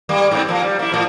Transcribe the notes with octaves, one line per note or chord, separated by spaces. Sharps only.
G#2 G3 A#3
G#2 C4
F3 A#3
G3
A#3 E4
A2 F3